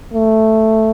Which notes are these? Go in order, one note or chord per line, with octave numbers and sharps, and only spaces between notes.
A3